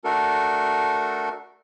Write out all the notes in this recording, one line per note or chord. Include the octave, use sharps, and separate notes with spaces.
A3 D4 F#4 A4 A#4